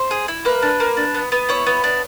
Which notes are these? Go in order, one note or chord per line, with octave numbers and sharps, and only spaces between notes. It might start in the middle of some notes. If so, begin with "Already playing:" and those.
Already playing: C5
G#4
E4
A#3 B4
D4
A#3
D4
B3
B3
E4 C#5
B3
D4